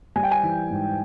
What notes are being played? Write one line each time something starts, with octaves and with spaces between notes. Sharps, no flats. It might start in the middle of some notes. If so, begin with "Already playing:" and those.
G3 G#5
G5
G#5
E3
G#2